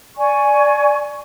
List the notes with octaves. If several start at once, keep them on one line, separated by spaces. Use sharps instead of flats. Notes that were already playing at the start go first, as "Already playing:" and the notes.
D5 G#5 C#6